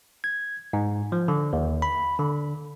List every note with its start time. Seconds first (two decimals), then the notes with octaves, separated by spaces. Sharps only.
0.24 G#6
0.73 G#2
1.12 F3
1.28 D3
1.53 D#2
1.82 B5
2.19 D3